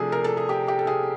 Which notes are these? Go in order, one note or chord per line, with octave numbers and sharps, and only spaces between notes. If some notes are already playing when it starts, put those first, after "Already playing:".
Already playing: C3 F3 A3 D4 G#4 A4
A#4
A4
G#4
G4
G4
A4
G#4